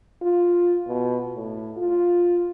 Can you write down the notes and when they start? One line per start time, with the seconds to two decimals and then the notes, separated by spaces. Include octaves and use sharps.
0.22 F4
0.87 B2
1.34 A2
1.77 F4